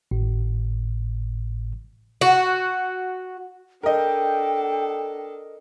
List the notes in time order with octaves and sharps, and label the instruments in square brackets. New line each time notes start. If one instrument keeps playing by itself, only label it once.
[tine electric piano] G#1 A2
[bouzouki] F#4
[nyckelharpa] D4 A4 [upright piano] A#4 D#5 [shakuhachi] G5